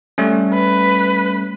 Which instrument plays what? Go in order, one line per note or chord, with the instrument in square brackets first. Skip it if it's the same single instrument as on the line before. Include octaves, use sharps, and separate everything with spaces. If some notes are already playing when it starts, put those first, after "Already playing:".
[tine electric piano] G3 A3 C#4
[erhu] B4